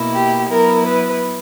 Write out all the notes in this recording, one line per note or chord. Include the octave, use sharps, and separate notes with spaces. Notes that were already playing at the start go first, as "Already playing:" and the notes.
Already playing: B2 A#3 E4
G4
F#3 B3 E4 A#4
B4